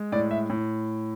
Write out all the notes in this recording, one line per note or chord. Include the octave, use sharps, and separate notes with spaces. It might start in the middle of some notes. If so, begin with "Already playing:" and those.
Already playing: G#3
A2 D5
E5
A2